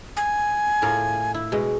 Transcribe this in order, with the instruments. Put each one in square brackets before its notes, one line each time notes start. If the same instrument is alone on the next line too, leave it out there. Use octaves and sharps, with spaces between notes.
[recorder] G#5
[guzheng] A2 F4 A#4
E4
B2 G#3